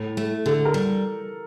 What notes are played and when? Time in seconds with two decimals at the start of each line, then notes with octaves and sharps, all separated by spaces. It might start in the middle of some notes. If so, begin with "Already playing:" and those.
Already playing: A2
0.17 A3
0.46 D3 A4
0.65 A#4
0.74 G3